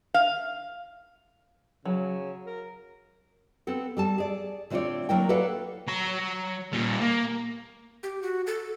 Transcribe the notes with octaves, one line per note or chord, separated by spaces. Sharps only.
F5
C#3 F#3
A#4
B3 C4 A4
G3 A4 A5
G#4 D5
D3 A3 C4 F4 C#5 D5
F#3 A#3 D4 E4 A#4 G5
A4 B4 C#5 D5 F5 F#5
F#3 A#5
A#2 G3
A#3
G4
F#4
A4